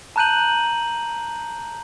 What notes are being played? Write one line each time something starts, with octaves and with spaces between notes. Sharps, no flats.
A5 A#5 F#6 G6 D#7 F#7